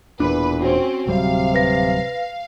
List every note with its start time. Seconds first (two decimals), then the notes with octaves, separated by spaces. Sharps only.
0.20 E1 E2 A#2 D4 B4
0.62 C4 C#4 F#4
1.07 D1 C3 F#3 G3 F5
1.55 B4 A#6